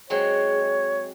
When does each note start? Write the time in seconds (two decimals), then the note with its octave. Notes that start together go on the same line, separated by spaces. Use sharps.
0.10 F#3 G#3 C4 C#5